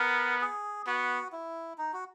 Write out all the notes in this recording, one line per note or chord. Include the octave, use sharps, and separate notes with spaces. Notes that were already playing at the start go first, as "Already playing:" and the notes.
Already playing: B3 A#4
G#4
B3 F#4
E4
D#4
F#4